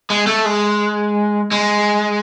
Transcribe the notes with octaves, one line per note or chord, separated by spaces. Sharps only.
G#3
A3
G#3
G#3